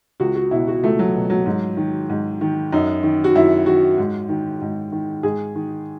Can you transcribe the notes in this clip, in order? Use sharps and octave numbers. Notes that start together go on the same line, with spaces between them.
C#2 F#4
F#4
B2 E4
F#4
C#2 A3
F#3
B2
F#3
G#2
D#3
G#2
D#3
F#2 D#4
D#3
F#4
F#2 E4
D#3 F#4
G#2
D#3
G#2
D#3
G#2 G#4
D#3